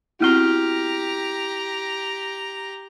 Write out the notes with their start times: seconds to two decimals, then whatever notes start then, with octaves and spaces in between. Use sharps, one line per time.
0.20 B3 C4 E4 F#4 G4 A#5 F6 G7